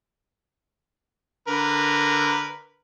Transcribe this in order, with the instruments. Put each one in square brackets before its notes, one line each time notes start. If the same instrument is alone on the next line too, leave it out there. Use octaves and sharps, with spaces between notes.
[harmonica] D3 A#4 B4